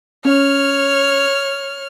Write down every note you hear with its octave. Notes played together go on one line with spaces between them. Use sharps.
C#4 C#5 F6